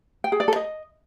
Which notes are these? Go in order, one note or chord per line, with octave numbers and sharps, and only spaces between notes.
G5
G#4
D5
A4
D#5